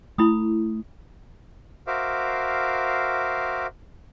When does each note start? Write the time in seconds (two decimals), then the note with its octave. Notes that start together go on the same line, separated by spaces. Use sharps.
0.18 A3 E4 B5 D#6
1.87 F#4 A#4 C5 E5 F5 D6